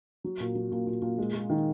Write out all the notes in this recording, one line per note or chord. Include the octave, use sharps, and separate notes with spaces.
F#3
A#2
F#3
A#2
A#2
A#2
G#3
G#3
D#3